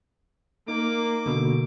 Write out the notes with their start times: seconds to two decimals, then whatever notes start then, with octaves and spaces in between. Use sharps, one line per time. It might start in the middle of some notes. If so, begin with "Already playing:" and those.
0.68 A#3 D#4 D6
1.26 B2 D3